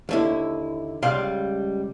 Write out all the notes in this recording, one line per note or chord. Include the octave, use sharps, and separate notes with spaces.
D#2 D3 E4
C#2 G3 D5 F5 C6